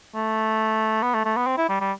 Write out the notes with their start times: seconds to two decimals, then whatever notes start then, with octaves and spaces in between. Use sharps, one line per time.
0.15 A3
1.02 B3
1.14 A3
1.25 A3
1.37 B3
1.47 C4
1.57 E4
1.69 G3
1.81 G3